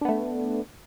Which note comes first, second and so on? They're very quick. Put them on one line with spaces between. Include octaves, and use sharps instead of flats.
D4 B3 A3